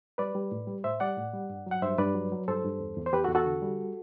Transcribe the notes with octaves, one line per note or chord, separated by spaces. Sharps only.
G3 B4 D5
G3
A2
G3
A2 C5 E5
G3 D5 F#5
A2
G3
G2
F#3 F#5
G2 C5 E5
G2 B4 D5
F#3
F#3
G2 A4 C5
G2
E2
E2
C5
E2 G4 B4
F#4 A4
E2
F#4 A4
D3
G3